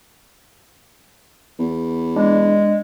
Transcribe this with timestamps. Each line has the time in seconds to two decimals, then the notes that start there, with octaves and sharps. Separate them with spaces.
1.59 E2
2.16 G#3 D4